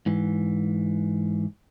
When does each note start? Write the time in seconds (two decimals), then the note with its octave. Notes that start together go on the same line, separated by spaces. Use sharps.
0.06 G#2 E3